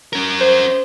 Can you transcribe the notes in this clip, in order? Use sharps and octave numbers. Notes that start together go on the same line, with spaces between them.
C#4 A#4
C5